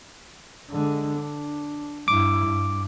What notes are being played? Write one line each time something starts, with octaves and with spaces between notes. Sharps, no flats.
D3 G#3
D4
G2 E4 D6
G2